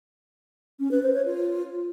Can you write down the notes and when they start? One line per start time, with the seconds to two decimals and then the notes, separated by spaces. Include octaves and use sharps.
0.80 C#4
0.91 B4
1.03 C5
1.14 C#5
1.26 F4